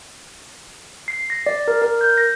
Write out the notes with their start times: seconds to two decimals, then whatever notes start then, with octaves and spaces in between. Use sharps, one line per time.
1.08 C7
1.30 A#6
1.46 D5
1.68 A#4
1.82 A#4
2.01 G6
2.18 A#6